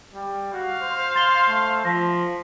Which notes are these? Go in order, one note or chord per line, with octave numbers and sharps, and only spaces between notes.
G3
F#4 F5
C5
C6 A6 G7
A3
F3 A#6 B6